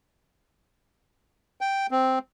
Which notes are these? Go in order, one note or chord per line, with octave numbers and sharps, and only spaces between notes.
G5
C4